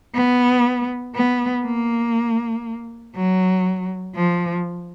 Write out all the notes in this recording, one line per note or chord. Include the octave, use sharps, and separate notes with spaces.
B3
B3
A#3
F#3
F3